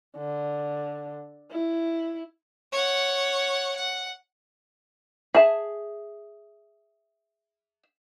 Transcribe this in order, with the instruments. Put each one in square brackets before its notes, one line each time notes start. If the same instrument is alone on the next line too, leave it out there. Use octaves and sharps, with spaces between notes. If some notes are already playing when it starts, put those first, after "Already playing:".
[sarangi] D3
E4
[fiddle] C#5 F#5
F#5
[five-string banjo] G#4 E5 A5